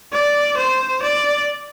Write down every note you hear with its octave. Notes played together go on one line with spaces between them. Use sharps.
D5
C5
D5